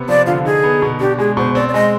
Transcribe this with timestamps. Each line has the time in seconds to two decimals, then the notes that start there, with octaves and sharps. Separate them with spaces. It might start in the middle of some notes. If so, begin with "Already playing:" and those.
Already playing: C3 B3
0.08 F3 D5
0.26 D3 F4
0.45 D#4 G#4
0.63 B3
0.82 B2
1.00 D4 G4
1.18 G#3 G#4
1.37 B2 C5
1.55 C4 D5
1.69 D5
1.74 G#3 D#5